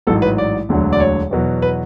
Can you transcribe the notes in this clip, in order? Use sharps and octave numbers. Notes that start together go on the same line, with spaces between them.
A1 G#2 F#3 A4
B4
D5
E1 D2 D3 F#3
D5
C#5
E2 B2 F#3
B4